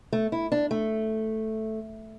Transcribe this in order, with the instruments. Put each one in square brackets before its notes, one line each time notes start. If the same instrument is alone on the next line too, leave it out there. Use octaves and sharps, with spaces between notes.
[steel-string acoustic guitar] A3
E4
D4
A3